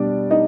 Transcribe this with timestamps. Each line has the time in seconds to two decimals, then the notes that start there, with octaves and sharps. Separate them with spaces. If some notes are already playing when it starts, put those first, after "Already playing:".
Already playing: B2 G3 D4 D5
0.31 D#4 D#5